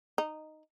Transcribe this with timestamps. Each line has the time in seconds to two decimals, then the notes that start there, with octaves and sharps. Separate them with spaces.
0.18 D#4